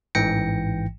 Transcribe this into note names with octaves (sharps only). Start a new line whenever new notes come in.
A1 G#2 E3 G5 A#6 C#7